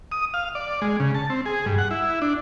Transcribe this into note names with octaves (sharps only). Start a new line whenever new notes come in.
D#6
F5
D5
G#3
C#3
A5
C4
G#4
G2
F#5
E4
D4